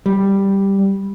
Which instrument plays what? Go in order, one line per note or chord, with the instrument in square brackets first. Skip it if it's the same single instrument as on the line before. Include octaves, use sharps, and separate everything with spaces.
[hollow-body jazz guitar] G3